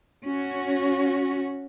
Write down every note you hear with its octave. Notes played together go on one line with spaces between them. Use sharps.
C#4 F#4